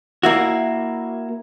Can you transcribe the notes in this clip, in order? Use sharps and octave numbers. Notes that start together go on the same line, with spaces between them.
A#3 E4 F#4